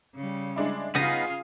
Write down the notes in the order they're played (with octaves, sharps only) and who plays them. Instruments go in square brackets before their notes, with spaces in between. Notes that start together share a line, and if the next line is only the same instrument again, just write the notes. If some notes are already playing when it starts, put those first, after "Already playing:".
[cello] C#3 G3
[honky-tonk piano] G#3 D4 E4
[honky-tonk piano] C#3 [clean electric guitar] B3 D#4 D#5 [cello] F4 G#4